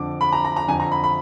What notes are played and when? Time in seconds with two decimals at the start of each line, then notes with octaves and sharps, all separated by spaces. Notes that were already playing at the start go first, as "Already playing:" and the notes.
Already playing: F2 D3 D6
0.21 B5
0.33 A#5
0.45 A#5
0.56 A#5
0.68 F2 D3 G#5
0.80 A#5
0.91 B5
1.04 B5